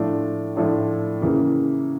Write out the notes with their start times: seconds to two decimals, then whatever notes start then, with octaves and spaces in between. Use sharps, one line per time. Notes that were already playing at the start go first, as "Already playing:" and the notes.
Already playing: A2 F3 A3 D4 F4
0.56 A2 F3 A3 D4 F4
1.21 C#3 E3 A#3